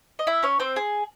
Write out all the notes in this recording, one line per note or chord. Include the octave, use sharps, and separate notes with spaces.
D#5
E4 E5
C#4 C#5
C4 C5
G#4